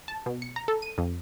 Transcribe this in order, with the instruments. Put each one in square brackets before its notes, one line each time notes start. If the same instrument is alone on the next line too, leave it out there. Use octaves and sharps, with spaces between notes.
[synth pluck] A5
B2
C#7
A#5
A4
D#7
F2